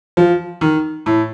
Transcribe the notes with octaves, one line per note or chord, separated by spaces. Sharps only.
F3
D#3
A2